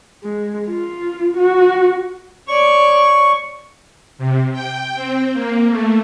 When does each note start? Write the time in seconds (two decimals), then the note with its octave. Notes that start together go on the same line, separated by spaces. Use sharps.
0.23 G#3
0.69 F4
1.37 F#4
2.48 C#5 D5 C#6
4.18 C3
4.53 G5
4.95 C4
5.33 A#3
5.69 A3